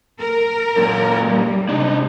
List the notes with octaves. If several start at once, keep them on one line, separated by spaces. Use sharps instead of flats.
A#4
F#2 A#2
G3
C3 G#3 D4 D#4